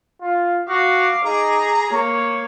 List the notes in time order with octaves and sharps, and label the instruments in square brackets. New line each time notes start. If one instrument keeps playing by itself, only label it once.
[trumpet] F4
[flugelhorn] F#4 [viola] F5 [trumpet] D6
[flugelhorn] D#4 [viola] G#4 [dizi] A#5
[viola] A#3 [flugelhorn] C#5